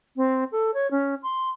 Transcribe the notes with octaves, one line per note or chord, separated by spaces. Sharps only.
C4
A4
C#5
C#4
C6